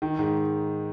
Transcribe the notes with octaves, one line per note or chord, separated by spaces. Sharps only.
D#3
G#2